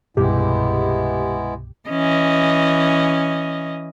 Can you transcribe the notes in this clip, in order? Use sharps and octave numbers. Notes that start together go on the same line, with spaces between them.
C2 G2 B2 G#3 B3 E4 G4
E3 C#4 D#5